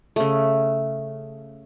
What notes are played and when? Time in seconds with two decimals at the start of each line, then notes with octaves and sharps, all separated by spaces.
0.16 C#3 A3